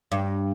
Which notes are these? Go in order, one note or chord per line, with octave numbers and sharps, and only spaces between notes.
G2